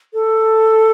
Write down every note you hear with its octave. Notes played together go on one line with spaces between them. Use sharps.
A4